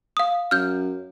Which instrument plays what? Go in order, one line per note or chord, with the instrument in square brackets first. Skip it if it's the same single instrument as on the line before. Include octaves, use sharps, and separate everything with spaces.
[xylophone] F5 D#6
[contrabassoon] F#2 [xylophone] F6 G6